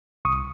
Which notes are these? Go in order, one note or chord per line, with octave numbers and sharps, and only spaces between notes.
C2 C#6 D#6